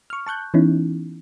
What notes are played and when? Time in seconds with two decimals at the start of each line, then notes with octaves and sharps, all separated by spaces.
0.10 C#6 F6
0.27 A5 C#6 F#6 G6
0.54 E3 B3 C#4 D#4 E4